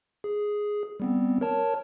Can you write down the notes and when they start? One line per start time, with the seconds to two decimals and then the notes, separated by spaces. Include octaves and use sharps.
0.24 G#4
1.00 G3 B3 C4
1.41 A#4 C#5 A5